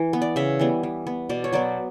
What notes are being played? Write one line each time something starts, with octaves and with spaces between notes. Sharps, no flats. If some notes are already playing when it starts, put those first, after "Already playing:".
Already playing: E3
B3
D5
C#3 E5
E3 G3 B3
E3
B3
B2 D5
C#5
F#3 B3 D5